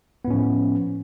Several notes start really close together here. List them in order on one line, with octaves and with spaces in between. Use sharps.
B3 A2 C#4 F3